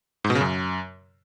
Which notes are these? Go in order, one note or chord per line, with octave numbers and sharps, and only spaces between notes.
G#2
B2
C#3
F#2